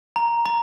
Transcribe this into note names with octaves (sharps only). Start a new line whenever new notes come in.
A#5
A#5